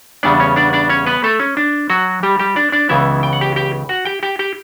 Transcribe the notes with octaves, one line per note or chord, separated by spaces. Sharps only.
E2 C#3 G3 B3 D4 D5
C#4 C#5
D4 D5
D4 D5
C#4 C#5
B3 B4
A3 A4
C#4
D4
F#3 F#4
G3 G4
G3 G4
D4 D5
D4 D5
C#2 C#3 E3 B3 E4 E5
G5
F#5
G4 G5
G4 G5
F#4 F#5
G4 G5
G4 G5
G4 G5